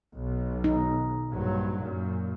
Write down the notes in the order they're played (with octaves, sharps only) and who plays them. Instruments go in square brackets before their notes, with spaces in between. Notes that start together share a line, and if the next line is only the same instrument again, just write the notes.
[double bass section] B1
[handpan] D#4
[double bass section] A#1 G2 F#3
F#2 A#2